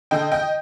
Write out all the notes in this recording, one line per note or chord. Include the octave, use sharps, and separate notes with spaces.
D3 D#5 G5
D#5 G5